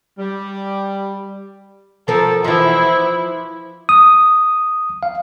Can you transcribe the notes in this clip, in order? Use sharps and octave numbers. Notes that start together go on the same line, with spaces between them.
G3
F3 A4 A#4
E3 F3 E4
D#6
F5